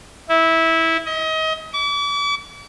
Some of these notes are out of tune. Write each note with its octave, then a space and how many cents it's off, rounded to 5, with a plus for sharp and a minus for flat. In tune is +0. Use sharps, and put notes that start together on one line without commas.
E4 -15
D#5 +30
D6 -40